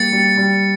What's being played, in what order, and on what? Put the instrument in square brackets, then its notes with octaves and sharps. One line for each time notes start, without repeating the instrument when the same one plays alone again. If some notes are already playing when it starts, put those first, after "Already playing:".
Already playing: [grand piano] G3 A#3 [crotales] A6 C#7
[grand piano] G3
G3